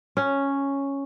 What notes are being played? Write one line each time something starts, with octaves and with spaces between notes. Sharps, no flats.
C#4